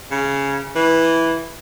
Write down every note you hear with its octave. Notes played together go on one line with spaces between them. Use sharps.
C#3
E3